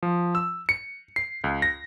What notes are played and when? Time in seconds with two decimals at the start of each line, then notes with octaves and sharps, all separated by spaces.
0.03 F3
0.35 E6
0.69 C#7
1.16 C7
1.44 C#2
1.62 A#6